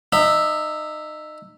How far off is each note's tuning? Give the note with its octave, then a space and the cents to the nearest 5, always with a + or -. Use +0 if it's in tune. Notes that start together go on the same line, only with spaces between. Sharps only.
D#4 -25 E5 +0